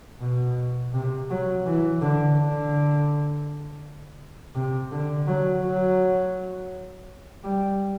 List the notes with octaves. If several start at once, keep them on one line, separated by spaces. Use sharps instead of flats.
B2
C3
F#3
E3
D3
D3
C3
D3
F#3
F#3
G3